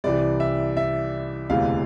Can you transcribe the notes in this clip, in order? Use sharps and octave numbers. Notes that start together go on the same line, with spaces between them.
C2 C3 E3 D5
E5
E5
E1 D2 C3 E3 F5